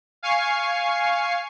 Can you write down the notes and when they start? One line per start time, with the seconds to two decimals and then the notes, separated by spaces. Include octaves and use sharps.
0.23 F5 G#5 C#6 C7